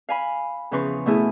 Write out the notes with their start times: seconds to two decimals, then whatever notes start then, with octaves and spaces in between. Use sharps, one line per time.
0.09 F5 G#5 B5
0.71 E2 C#3 F3 B4 C6 C#6
1.06 B2 A3 B3 E4 G#4